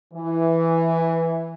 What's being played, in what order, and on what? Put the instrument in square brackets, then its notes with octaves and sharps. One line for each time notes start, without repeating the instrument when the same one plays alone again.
[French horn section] E3